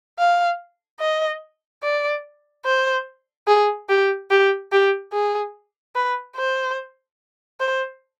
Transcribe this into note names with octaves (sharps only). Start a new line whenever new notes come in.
F5
D#5
D5
C5
G#4
G4
G4
G4
G#4
B4
C5
C5